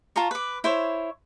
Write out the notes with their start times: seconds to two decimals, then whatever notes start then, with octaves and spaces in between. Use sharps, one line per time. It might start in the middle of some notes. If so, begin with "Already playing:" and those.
0.16 F4 A5 A#5 C#6
0.31 B4 D6
0.64 E4 C5 C#5